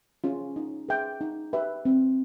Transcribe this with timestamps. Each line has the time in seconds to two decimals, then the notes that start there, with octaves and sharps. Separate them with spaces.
0.24 C#4 F4 G#4
0.56 D#4
0.89 G#4 B4 E5 G5
1.21 D#4
1.53 G4 B4 E5 G5
1.85 C4